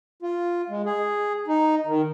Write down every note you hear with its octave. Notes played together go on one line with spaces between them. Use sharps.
F4
G#3
G#4
D#4
D#3